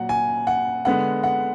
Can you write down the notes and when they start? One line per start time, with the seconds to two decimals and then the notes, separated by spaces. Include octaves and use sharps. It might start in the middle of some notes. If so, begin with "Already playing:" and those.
Already playing: A#2 F#3 F#5
0.09 G#5
0.47 F#5
0.85 D3 G#3 B3 F#5
1.23 F#5